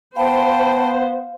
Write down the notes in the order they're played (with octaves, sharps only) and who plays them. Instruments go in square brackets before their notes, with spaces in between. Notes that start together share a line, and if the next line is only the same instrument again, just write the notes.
[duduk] B3 [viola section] C5 [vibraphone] F5 [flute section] G5 A5 B5